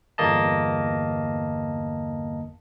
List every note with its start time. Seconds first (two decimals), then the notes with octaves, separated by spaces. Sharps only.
0.18 G1 E2 A#3 D#5 A5